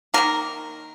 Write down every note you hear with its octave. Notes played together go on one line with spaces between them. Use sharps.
D#3 G3 A#3 A#4